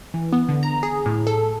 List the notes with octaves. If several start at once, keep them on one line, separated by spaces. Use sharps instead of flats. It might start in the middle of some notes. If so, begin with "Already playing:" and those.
E3
B3
D3
A#5
G#4
A2
A4